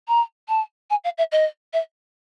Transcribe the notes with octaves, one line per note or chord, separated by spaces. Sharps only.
A#5
A5
G#5
F5
E5
D#5
E5